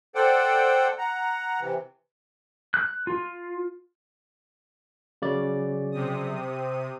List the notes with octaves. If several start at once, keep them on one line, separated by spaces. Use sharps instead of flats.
A4 C5 D5 F#5 G5
F#5 A#5
C3 E3
F#6
F4
C#3 F#3 D5
C3 D#6